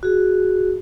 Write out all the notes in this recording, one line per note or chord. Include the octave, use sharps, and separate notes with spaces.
F#4 G#4